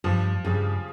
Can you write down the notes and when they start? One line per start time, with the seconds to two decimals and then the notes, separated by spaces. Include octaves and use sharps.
0.04 G2 F3
0.45 G2 C#3